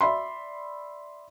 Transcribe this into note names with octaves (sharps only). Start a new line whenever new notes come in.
D5 E5 B5 C6